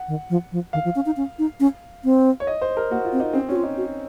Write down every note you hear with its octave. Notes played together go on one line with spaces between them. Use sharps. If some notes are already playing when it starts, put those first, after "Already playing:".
Already playing: F#5
D#3
F3
F3
D#3 F5
F3
C#4
D#4
C#4
D#4
C#4
C4
C#5
D#5
C5
A#4
A#3 F#4
F4
C4
D#4
C4 C#4
C#4 F#4
F4
D#4
F#4